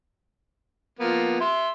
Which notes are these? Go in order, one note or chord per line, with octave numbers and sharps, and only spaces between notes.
F3 A#3 B3
E5 C6